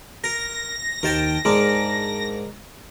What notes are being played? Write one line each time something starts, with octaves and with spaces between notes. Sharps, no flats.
A#4 A#6
D#2 D#3 A#4 C5 G5 A5
G#2 G#3 D4 A#4 D6